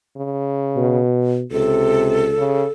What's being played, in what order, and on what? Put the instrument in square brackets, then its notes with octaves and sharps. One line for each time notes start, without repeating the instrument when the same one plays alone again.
[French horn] C#3
[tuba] B2
[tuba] C#2 [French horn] C3 [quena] A4
[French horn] C#3